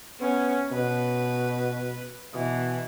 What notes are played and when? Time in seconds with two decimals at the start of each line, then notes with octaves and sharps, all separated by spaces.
0.20 B3 C#4
0.72 B2 B4
2.34 B2 E3